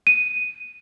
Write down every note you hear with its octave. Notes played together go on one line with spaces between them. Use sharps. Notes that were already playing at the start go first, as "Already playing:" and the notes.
D#7